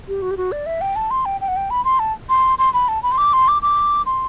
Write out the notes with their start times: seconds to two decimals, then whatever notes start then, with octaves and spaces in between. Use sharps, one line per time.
0.08 G4
0.22 F#4
0.31 G4
0.37 F#4
0.52 D5
0.66 E5
0.81 G5
0.96 A5
1.11 C6
1.25 G5
1.41 G5
1.48 F#5
1.56 G5
1.70 B5
1.85 C6
1.99 A5
2.29 C6
2.58 C6
2.74 B5
2.88 A5
3.03 B5
3.12 C6
3.18 D6
3.33 C6
3.48 D6
3.62 D6
4.06 C6